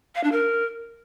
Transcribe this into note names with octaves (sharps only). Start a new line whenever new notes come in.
F5
D4
A#4